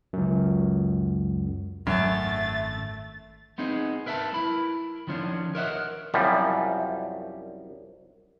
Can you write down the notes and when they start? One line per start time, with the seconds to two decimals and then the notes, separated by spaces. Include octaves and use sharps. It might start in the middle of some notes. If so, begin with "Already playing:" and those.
0.13 C#2 F#2
1.87 G#1 F#2 A3 C#4 E5 A6
3.58 B3 C4 D#4 G#4
4.06 A#4 B4 E5 G#5 A5
4.34 E4 A#4 B5
5.07 D#3 F3 C#4 D4
5.55 A#4 C#5 D#5 E5 F#5
5.71 A#4
6.14 C2 F#2 F3 G3